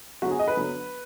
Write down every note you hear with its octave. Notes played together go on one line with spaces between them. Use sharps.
D3 F#3 B3 F#4
G#4
D#5
B4
D3 F#3 B3